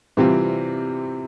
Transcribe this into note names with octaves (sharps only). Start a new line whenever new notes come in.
C3 E3 G3 C4 F4